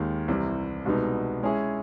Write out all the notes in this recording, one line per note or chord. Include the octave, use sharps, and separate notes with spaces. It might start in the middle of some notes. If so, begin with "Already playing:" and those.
Already playing: D#2 D#3 G#3
C2 C3 E3
C2 B2 G#3 B3 D#4
G#3 C#4 E4 G#4